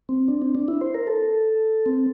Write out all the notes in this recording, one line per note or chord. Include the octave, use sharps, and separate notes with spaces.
C4
D4
C4
D4
E4
C5
A#4
A4
C4